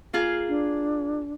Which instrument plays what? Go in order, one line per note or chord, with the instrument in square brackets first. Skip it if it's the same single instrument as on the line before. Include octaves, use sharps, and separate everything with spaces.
[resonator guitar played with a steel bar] A#3 F4 G#4
[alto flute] D4